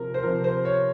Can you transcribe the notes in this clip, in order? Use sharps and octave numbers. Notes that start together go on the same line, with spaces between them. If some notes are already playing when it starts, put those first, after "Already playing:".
Already playing: C3 F3 A#4
C5
C3 F3 A#4
C5
C#5